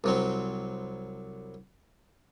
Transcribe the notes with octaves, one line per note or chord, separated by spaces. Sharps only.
C2 F#3 C4